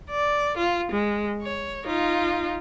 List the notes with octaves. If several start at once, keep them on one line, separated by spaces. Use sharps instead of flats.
D5
F4
G#3
C#5
D#4 F4